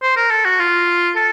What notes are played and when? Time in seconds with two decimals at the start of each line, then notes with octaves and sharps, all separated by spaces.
0.02 C5
0.16 A#4
0.31 A4
0.45 F#4
0.59 F4
1.16 A4